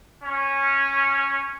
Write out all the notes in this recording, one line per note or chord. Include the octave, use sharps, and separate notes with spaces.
C#4